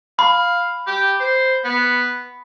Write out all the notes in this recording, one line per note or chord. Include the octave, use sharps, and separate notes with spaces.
F5 B5
G4
C5
B3